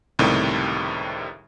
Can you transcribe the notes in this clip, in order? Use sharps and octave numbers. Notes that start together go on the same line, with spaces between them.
C#2 A2 C3 D#3 G3